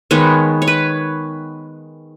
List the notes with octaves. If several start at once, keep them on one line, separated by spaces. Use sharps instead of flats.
D#3 G#3 B3 C#5
C#5
B4